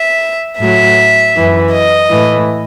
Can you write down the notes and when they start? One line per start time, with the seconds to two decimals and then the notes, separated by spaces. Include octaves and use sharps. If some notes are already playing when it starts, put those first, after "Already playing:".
Already playing: E5
0.59 A2 F#3 E5
1.35 F#2 E3
1.72 D#5
2.10 A2 E3